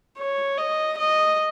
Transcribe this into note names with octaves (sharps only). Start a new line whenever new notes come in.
C#5
D#5
D#5